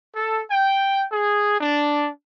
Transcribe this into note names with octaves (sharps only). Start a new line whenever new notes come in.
A4
G5
G#4
D4